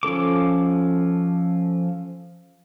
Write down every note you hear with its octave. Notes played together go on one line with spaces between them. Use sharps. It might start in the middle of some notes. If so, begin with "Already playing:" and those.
F3 C#4 A4 D6